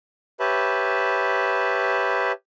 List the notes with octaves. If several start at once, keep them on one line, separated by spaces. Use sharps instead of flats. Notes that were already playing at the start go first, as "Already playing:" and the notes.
G4 B4 C#5 E5 A5 B5